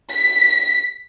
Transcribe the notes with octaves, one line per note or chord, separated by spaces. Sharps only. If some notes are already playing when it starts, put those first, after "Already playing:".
B6